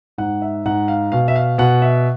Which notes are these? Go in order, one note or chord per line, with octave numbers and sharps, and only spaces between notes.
G#2 F#5
E5
G#2 F#5
F5
B2 F5
E5
F5
B2 F#5
E5